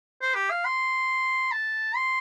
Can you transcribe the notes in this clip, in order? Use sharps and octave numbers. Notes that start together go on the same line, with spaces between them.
C5
G4
F5
C6
A5
C6